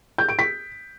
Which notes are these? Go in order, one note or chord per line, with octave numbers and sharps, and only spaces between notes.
G6
D7
B6